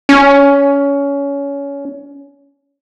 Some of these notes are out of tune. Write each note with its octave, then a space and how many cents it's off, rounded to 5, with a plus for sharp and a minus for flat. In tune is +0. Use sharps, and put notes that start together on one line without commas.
C#4 +20